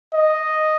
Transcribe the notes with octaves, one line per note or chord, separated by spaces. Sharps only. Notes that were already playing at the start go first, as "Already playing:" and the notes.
D#5